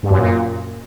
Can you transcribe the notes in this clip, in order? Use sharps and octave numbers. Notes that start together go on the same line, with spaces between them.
G2
F#2
A#2